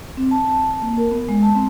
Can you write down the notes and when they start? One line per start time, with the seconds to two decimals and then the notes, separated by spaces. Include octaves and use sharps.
0.17 C4
0.31 A5
0.48 A5
0.82 A#3
0.98 A#4
1.12 B3
1.29 G#3
1.42 A5
1.55 C4